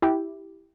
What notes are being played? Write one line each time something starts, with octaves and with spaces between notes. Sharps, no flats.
E4 G4